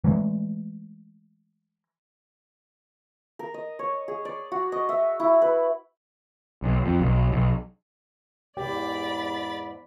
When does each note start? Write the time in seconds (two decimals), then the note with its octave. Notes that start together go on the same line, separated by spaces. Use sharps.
0.04 E3 F#3 G#3 A3
3.39 A#4
3.54 D#5
3.79 C#5
4.08 G#4
4.25 D5
4.52 F#4
4.72 D#5
4.89 E5
5.20 E4
5.42 B4
6.62 B1
6.85 F2
7.01 B1
7.32 B1
8.57 E2 G#2 G4 D5 B5 A6